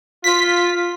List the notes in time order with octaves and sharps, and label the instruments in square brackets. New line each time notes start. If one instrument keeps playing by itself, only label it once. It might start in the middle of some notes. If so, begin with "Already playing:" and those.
[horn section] F4 [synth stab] B6